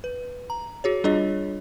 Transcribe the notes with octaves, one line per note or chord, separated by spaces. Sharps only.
B4
A#5
F#4 G#4 C#5
G3 D4 F4 G#4 C#5 D#5